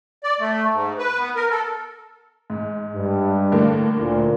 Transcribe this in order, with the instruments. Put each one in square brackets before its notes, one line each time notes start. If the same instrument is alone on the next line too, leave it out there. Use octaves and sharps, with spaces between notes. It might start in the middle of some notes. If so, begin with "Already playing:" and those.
[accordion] D5
A3
G#2
B4
B3
A#4
A4
[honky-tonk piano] G#2
[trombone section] G2
[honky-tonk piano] A2 D3 A#3
[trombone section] D2 A#2